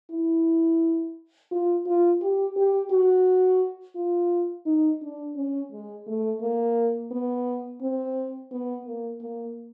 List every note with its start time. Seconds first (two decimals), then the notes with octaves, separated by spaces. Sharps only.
0.11 E4
1.51 F4
1.86 F4
2.22 G4
2.56 G4
2.91 F#4
3.96 F4
4.66 D#4
5.02 D4
5.36 C#4
5.72 G#3
6.07 A3
6.41 A#3
7.11 B3
7.82 C4
8.52 B3
8.85 A#3
9.22 A#3